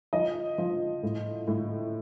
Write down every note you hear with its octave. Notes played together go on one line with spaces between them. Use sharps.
F3 D#5
F3
A2
A2